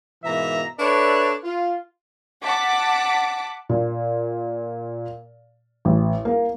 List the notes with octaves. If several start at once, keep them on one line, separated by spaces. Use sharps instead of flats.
G#2 B2 E3 A#3 E5 A#5
D4 A4 B4 C#5 D5 E5
F4
F#5 A5 D6 B6
A#2
A1
A#3